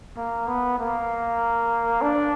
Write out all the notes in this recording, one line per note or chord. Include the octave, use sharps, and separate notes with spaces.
A#3
B3
A#3
D4